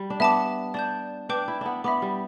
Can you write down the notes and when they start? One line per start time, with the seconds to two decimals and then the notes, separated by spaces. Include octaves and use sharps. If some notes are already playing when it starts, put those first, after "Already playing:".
Already playing: G3
0.10 D4
0.20 B3 E5 A5 D6
0.74 D4 D5 A5 G6
1.29 D4 B4 G5 D6 G6
1.48 E4
1.61 B3 D4
1.84 B3 E5 B5 D6
2.02 G3